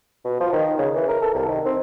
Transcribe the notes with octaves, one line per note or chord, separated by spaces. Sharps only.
B2
F3
D#3
C#3
E3
A#4
A4
C2
D#3
C4